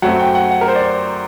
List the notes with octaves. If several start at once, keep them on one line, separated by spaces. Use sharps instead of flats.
F#2 F#3 A3 C4 F#5
G5
F#5
F#5
A#4
C5
D5